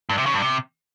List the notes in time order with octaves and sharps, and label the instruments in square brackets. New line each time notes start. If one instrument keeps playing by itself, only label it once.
[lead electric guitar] G2
C3
C#3
G2
C3